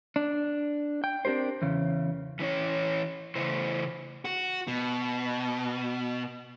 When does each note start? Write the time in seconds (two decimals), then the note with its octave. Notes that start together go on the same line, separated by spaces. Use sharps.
0.16 D4
1.04 G5
1.25 C4 D4 G4 A#4 C5
1.62 E2 C#3
2.39 E3 C#4 E4 C#5
3.35 C#3 E3 A3 C5
4.25 F#4
4.68 B2